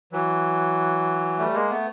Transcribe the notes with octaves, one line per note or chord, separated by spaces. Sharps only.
E3 F#3
G3 A3
G#3 A#3
A3 B3